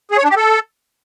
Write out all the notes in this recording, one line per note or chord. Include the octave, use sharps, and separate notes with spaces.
G#4
C#5
D4
G4
A4